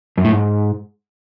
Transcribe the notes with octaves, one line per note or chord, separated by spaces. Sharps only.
F#2
A2
G#2